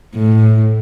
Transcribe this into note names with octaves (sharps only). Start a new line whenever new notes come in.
A2